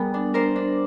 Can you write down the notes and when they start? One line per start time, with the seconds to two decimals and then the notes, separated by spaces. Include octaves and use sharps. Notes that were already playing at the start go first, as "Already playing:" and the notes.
Already playing: G3 B3 G#4 A#4
0.14 D4
0.34 D4 A#4 C5
0.56 D4